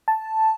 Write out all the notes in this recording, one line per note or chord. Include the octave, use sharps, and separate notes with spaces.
A5